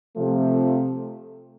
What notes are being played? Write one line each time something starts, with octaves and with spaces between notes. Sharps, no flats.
C3 F3 A3